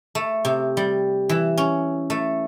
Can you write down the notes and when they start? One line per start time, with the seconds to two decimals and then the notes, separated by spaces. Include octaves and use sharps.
0.15 A3
0.45 C3
0.77 G3
1.29 E3
1.58 C#4
2.10 A3